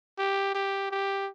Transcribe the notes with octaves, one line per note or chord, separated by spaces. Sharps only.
G4
G4
G4